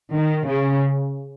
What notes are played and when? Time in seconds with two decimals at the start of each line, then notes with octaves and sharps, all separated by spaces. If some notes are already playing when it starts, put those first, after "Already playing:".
0.13 D#3
0.46 C#3